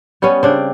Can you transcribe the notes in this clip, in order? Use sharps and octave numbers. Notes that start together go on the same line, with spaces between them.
G3 B3 C#4
C#3 C4 D4